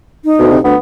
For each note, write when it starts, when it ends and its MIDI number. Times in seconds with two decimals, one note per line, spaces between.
0.25 0.59 63
0.39 0.58 38
0.39 0.47 47
0.51 0.59 48
0.64 0.75 38
0.64 0.77 59